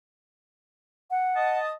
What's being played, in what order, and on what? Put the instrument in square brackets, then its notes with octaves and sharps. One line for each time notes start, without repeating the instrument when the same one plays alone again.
[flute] F#5
[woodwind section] D#5 A5 D#6